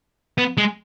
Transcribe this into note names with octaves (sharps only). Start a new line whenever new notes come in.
B3
G#3